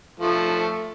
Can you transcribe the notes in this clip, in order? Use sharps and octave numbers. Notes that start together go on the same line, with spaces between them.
F3 A3